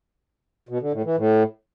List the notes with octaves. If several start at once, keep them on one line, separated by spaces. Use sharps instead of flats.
B2
D3
A2
E3
A2